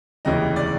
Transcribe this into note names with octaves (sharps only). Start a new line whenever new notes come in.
F1 D#2 C#3 E3 D#5
D5